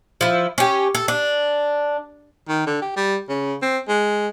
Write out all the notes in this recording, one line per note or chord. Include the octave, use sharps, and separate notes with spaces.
F3 E4
C#4 G4
A4
D4
D#3
D3
G4
G3
C#3
C4
G#3